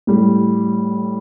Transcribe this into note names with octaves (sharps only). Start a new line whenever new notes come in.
A2 G3